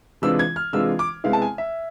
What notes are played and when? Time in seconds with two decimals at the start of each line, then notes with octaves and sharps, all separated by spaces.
0.22 C3 E3 G#3 D4 F4 E6
0.39 G#6
0.56 F6
0.73 C3 E3 G#3 D4 F4 E6
0.99 D6
1.24 C3 G#3 B3 E4 F5
1.33 A5
1.42 G#5
1.58 E5